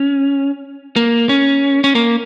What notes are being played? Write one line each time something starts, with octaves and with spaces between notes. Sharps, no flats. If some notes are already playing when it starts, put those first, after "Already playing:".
Already playing: C#4
A#3
C#4
C#4
A#3